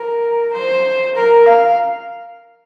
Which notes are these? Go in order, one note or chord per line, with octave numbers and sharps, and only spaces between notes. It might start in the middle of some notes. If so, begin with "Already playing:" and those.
Already playing: A#4
C5
A#4
F5